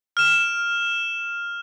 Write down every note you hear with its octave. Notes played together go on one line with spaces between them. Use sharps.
F6 E7